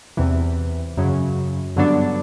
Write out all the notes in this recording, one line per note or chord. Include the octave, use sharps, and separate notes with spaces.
E2 C3 E3
F#2 C#3 F#3
G2 D3 F#3 B3 D4